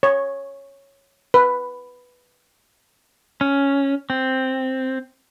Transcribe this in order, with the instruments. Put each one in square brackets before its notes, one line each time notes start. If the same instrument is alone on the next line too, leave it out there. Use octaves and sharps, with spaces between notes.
[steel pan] C#5
B4
[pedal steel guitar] C#4
C4